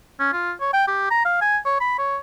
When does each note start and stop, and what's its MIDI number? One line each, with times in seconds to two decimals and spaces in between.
0.20 0.32 61
0.33 0.52 65
0.60 0.69 73
0.73 0.84 79
0.87 1.06 67
1.10 1.22 82
1.25 1.40 77
1.41 1.58 80
1.66 1.79 73
1.80 1.93 83
1.98 2.18 73